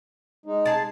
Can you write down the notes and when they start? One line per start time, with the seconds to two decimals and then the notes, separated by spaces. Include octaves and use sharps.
0.46 G#3 D#4
0.66 G#4 A5